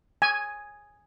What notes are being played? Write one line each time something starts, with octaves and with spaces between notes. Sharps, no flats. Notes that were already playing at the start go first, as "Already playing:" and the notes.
G#5